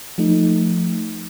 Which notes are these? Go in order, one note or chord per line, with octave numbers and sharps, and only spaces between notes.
F3 A3 D#4